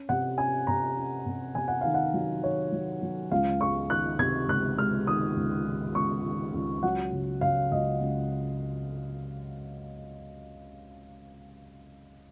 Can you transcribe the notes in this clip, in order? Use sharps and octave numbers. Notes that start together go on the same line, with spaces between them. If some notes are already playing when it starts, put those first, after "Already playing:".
Already playing: C#4
C3 F#5
C#4 G#5
C3 A#5
C#4
C3
C3 G#5
F#5
D#3 F5
F#5
F#3
D#3 C#5
F#3
F#3
C#2 F5
G#3 C#6
D#3 F#6
C3 G#6
C#2 F#6
G#3 F6
D#3 D#6
C#2
D#3
C#2 C#6
D#3
C#2
F#3 F#5
C#3
C#3 F5
C#2 D#5
C#2